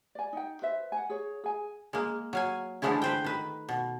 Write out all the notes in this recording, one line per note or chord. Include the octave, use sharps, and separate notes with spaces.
D5 G#5
D#4 G5
B4 C5 E5
F#5 G#5
G#4 C#5
G#4 G#5
G#3 A#3
F#3 F5 G#5
D3 E3 F3 G#3 A3 E4
B4 C5 G5
D#3 B4
B2